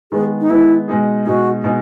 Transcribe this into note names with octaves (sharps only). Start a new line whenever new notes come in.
D#3 G#3 B3 G#4
D#4
D#3 G#3 B3 E4
B2 G#3 D#4 G#4
B2 G#3 D#4 F#4 G#4
B2 G#3 D#4 G#4